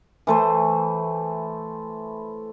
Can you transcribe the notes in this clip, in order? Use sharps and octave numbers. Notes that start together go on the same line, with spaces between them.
E3 A3 C5